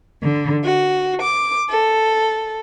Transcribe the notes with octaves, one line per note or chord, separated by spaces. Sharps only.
D3
F#4
D6
A4